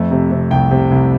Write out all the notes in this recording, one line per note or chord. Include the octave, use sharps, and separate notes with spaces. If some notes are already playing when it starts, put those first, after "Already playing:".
Already playing: F2 A3
C3
C3
C2 G5
C3
C2